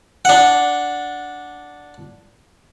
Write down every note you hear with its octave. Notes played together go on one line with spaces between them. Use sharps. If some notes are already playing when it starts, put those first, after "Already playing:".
D4 F#5